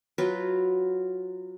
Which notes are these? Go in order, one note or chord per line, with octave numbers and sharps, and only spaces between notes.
F#3 F4 B4